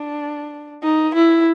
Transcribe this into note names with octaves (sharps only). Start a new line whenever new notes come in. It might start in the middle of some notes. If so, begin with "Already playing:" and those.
Already playing: D4
D#4
E4